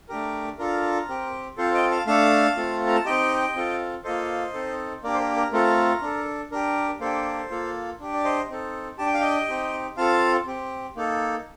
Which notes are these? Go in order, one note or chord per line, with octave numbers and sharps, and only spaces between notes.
A3 D4 G4 A#4
D4 F4 A4 A#4
C4 G4
C4 F4 A4 C5
D#5 G5
F5 A5
A3 D4 A4 F5 A5
A3 C4 F4 A4
A#5
A5
C4 D#4 G4 D#5 G5
C4 F4 A4
A#3 F4 A4 C5 D#5
C4 D#4 A4
A#3 D4 G4 A#4 D5
C5
A#4
A#4
A3 C4 F4 A4 A#4
D4 A4
D4 G4 A#4
A#3 D4 G4 A4 C5
A#3 F4 A4
D4 G4
D5
C5 D#5
C4 D#4 A4
D4 G4 A5
G5
F5
D#5 G5
C4 D#4 G4
C4 F4 A4 F5 A5
C4 G4
A#3 D#4 A4